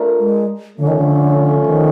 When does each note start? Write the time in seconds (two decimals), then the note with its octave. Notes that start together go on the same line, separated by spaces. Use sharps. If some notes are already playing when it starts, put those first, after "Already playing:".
Already playing: A3 D4 F4 A#4
0.19 G#3
0.77 D3 F3 A3 C#4
0.87 D#3
0.97 D3
1.66 D#3